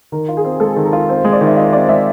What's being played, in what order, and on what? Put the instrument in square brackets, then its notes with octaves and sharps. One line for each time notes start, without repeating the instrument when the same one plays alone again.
[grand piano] D#3 [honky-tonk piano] A#4
[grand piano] F4
[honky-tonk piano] G#4
[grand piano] C4
[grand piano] G#3 [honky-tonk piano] A4
[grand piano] D#3
[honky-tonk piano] A#4
[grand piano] F4
[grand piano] C4 [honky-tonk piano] C5
[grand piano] G#3
[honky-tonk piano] D5
[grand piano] D#3
[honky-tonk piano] E5
[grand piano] F4 [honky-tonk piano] D#5
[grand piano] C4 [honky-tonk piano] D5
[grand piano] G#3 [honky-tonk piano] E5